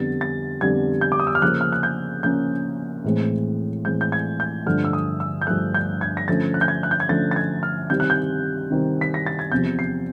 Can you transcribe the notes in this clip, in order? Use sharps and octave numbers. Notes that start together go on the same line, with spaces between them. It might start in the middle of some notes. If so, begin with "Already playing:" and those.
Already playing: F2 D3 G3 B3 A6
A6
F2 D3 G3 B3 G#6
G6
D6
D#6
E6
F6
C#3 F3 A#3 C#4 F#6
F6
F#6
G6
C#3 F3 A#3 C#4 G6
A2 E3 G#3 C4
A2 E3 G#3 C4 G6
G6
G#6
G6
G2 D3 F3 A3 F6
E6
D#6
E6
G6
G2 D3 F3 A3 F#6
G6
G#6
A#6
D3 F3 A3 C#4 A6
F#6
G6
G#6
F#6
G6
G#6
D3 F3 A3 C#4 A6
A6
G#6
F6
C3 D#3 G3 C4 G6
F#6
G6
C3 D#3 G3 C4
B6
A#6
A6
G#6
E2 C3 F3 G6
C7